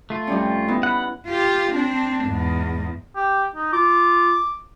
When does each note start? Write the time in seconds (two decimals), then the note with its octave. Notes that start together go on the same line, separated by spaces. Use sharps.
0.10 A3 F4
0.27 F2 G3 C#4
0.68 B3 D#4 E4
0.83 F#5 B5
1.27 F4 G4
1.72 C4 D4
2.25 E2 G#2
3.16 G4
3.56 D#4
3.73 F4 D6